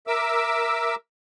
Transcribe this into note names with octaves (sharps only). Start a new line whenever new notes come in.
A#4 E5 D6 E6